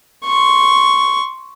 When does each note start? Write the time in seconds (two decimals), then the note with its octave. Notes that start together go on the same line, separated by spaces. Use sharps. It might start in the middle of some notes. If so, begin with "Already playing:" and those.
0.25 C6 C#6